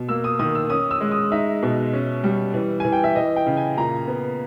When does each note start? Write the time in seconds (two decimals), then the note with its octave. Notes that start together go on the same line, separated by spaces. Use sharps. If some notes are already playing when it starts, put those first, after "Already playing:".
Already playing: B2
0.09 A#3 E6
0.24 D#6
0.39 D#3 D#6
0.55 E6
0.70 C#4 D#6
0.91 E6
1.01 G#3
1.11 D#6
1.32 D#4 E5
1.63 B2
1.93 C#4
2.24 G3
2.54 E3
2.80 E3 G#5
2.93 G5
3.04 E5
3.16 E3 D#5
3.36 G5
3.47 C#3
3.57 G#5
3.77 A#2 A#5
4.08 B3